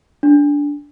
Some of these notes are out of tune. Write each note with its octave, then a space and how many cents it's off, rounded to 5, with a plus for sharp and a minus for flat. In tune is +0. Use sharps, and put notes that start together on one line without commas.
D4 -15